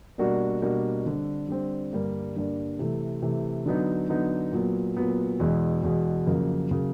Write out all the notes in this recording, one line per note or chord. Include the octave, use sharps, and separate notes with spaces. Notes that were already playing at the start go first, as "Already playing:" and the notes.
B2 G3 A#3 D4 F#4
B2 G3 A#3 D4 F#4
D3 G3 C4
D3 G3 C4
G2 D3 G3 A#3 D4
G2 D3 G3 A#3 D4
C3 E3 A3
C3 E3 A3
D3 F#3 B3 D#4
D3 F#3 B3 D#4
A#2 F#3 B3
A#2 F#3 B3
E2 B2 G#3
E2 B2 G#3
F2 C#3 F#3 A#3
C#3 F#3 A#3